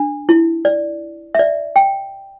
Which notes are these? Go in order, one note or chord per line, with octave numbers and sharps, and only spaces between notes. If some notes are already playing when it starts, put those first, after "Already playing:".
Already playing: D4
E4
D5
E5
D5
G5